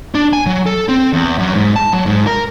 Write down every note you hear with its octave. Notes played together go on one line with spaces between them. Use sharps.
D4
G#5
F#3
A4
C4
E2
F#2
G#2
A5
F#3
G#2
A#4